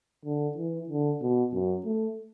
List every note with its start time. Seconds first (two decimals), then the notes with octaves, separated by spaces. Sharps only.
0.25 D3
0.57 E3
0.89 D3
1.21 B2
1.53 F#2
1.85 A3